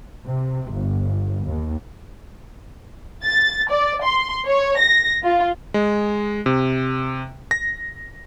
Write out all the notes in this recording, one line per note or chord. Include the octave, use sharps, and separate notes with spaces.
C3
G1
D#2
A6
D5
C6
C#5
A#6
F4
G#3
C3
A#6